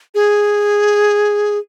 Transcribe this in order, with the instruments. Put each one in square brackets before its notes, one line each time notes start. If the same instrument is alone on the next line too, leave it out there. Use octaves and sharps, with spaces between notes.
[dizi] G#4